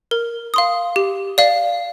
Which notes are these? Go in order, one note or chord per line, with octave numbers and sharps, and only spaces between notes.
A#4
F5 C6 D#6
G4
D5 F5